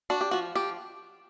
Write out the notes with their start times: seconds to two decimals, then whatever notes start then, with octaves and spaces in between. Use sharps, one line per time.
0.10 D4 F#4
0.21 G4
0.31 F3 F#4
0.55 F3 G4